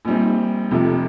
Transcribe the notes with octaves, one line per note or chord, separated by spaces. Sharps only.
A#1 A#2 G3 C4 D#4
F1 F2 C3 F3